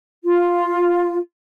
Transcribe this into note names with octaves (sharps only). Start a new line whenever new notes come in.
F4